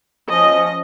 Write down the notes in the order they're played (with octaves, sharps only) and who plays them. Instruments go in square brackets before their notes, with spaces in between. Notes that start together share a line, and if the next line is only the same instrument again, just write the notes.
[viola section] F3 C#4 D#5